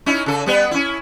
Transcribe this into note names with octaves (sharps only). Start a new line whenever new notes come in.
C#4 D#4 E4
C#3 A4
G3 B3 B4
C#4 E4